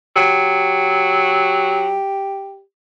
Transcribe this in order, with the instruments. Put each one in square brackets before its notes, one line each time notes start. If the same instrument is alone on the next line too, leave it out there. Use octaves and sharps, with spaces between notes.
[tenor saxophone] F#3 [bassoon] G4